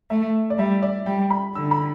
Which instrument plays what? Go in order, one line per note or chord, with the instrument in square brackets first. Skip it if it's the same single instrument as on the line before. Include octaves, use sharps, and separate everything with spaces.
[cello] A3 [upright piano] E5
[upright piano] D5
[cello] G3 [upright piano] E5
[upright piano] D5
[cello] G3 [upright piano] G5
[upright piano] B5
[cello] D3 [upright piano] E6
[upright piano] B5